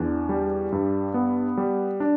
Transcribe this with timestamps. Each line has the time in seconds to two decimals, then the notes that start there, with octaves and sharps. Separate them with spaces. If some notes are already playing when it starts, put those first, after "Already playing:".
Already playing: E2 D4
0.29 G3
0.72 G2
1.14 B3
1.57 G3
2.00 D4